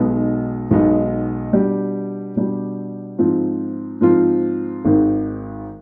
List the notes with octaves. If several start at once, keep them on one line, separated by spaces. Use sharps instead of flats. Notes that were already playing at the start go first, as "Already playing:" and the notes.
Already playing: B1 B2 G#3 B3 D#4
B1 B2 G#3 B3 D#4
B2 G3 D4 G4
B2 G3 D4 G4
G#2 F3 C4 F4
G#2 F3 C4 F4
G#1 G#2 D#3